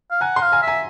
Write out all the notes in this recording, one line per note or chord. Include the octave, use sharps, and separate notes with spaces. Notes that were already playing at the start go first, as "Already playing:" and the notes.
F5
F#5 G#5 A#5
A#5 C6
F5
G#5 A#5
E5
G#5 A#5